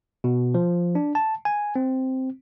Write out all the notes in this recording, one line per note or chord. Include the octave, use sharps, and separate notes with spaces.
B2
F3
D4
A5
G#5
C4